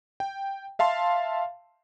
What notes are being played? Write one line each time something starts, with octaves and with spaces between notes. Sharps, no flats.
G5
E5 F5 A5 C6